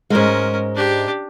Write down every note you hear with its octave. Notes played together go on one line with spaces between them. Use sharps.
G#2 G#3 C#4 A#4
D4 G4